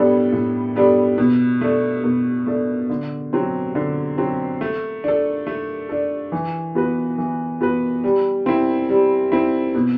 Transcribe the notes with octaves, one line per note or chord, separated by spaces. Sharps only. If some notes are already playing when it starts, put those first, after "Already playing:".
Already playing: A2 G3 B3 D4 A4
A2
G3 B3 D4 A4
B2
A3 D4 A4
B2
A3 D4 A4
D3
F#3 C4
D3
F#3 C4
A3
D4 A4
A3
D4 A4
E3
B3 F#4 B4
E3
B3 F#4 B4
G3
C4 E4
G3
C4 E4
B2